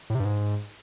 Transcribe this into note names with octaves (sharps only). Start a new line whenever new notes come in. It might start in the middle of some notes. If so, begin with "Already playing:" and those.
A2
C3
G2
G#2